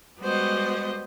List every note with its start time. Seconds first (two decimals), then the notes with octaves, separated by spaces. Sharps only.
0.20 G3 G#3 B3 F#4 C5 D#5